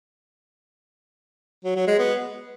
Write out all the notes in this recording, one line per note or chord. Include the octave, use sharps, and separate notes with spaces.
F#3
F#3
G#3
B3